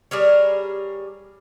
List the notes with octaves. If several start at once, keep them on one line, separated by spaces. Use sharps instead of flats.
G3 G#4 A#4 C#5